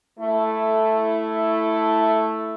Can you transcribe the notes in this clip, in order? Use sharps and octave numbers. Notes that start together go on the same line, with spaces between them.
A3 E4